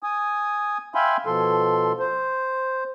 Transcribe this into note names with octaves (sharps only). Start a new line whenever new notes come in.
G#5 D#6
E5 F5 G5 G#5 B5 C6
B2 F3 A4 C6
C5